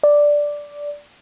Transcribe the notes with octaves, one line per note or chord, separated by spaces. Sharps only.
D5